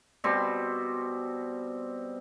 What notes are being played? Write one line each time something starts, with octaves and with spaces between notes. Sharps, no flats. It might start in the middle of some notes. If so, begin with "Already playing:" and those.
B2 G3 C4 C6